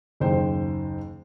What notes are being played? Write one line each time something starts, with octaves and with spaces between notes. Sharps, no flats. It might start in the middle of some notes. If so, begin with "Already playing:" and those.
F#1 D#2 C5 G5